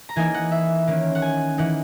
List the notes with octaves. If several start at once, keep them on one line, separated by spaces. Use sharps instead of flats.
A#5
E3 A#3 D#4 G#5
F#5
E5
D#3 A#3 C#4
F#5
G#5
E3 A#3 D#4 F#5